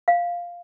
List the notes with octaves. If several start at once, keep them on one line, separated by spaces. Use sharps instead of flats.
F5